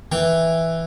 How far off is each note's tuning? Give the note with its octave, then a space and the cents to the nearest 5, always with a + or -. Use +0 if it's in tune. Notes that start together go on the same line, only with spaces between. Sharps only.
E3 +0 G5 +0